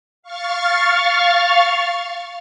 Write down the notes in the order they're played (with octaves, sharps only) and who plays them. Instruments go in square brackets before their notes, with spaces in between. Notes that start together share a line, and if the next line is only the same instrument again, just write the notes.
[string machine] F5 C#6 F6 A6